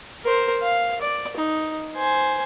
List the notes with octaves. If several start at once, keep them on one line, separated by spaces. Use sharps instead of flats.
A#4 C5
F5
D5
D#4
C5 G#5